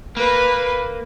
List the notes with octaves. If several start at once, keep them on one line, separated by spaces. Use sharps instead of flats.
A#3 B4